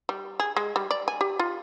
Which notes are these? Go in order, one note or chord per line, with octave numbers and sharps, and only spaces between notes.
G3
G#4
G#3
G3
D5
G#5
G4
F4